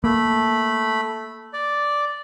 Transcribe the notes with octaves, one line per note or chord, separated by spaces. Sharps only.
A3 A#3 B5
D5